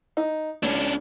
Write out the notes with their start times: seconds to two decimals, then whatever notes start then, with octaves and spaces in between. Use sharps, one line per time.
0.17 D#4
0.63 C#2 C#4 D4